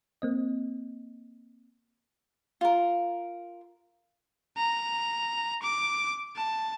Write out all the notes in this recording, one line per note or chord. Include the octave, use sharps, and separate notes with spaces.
A#3 C4 D#5
F4 A#4
A#5
D6
A5